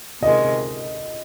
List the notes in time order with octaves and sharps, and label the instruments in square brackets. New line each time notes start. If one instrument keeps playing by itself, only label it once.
[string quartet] C3 D#3 G#3 [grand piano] D#5